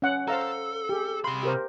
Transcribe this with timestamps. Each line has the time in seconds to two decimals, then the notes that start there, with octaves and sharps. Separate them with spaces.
0.02 C#4 F#5
0.28 A4 C5 F5 A#5
0.89 G4 G#4
1.24 C3 B5 C6
1.43 G4 A#4 C5